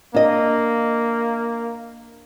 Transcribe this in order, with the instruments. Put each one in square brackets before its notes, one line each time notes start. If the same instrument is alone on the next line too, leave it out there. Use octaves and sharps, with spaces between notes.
[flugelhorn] A#3 [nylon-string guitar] D4 D#5